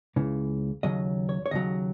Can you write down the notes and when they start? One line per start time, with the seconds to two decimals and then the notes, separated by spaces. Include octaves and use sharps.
0.16 C#2 C#3 E3
0.83 D#2 C#3 F#3 D#5
1.29 C#5
1.46 C#5
1.51 D#2 C#3 F#3 D#5